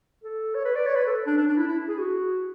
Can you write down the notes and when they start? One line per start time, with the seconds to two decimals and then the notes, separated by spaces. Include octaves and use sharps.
0.24 A4
0.55 C#5
0.65 B4
0.76 D5
0.86 C#5
0.96 B4
1.07 A4
1.27 D4
1.37 D4
1.47 D4
1.57 E4
1.68 E4
1.88 G#4
1.99 F#4